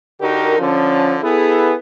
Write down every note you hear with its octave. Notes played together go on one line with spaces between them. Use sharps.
D3 D#4 F#4 G4 A#4
D3 F3 C#4
B3 E4 G#4 A4